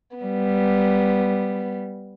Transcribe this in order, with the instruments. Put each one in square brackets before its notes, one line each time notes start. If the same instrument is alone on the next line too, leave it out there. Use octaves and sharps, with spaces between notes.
[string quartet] G3 B3